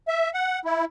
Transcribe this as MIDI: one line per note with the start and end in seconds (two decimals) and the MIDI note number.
0.08 0.30 76
0.34 0.59 78
0.65 0.85 64